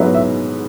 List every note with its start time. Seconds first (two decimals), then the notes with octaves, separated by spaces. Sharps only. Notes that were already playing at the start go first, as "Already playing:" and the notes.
Already playing: G#2 F#3 B3 D#5 E5
0.14 E5